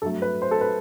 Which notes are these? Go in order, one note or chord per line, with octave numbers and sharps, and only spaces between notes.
G2 F#3 A3 A4
B4
C5
A4
B4